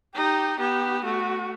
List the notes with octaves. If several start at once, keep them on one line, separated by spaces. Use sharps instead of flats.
D#4 G4
B3 G4
A3 F#4